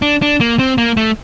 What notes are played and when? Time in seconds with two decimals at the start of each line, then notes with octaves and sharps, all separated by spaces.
0.02 D4
0.22 D4
0.40 A#3
0.59 C4
0.78 A#3
0.97 A3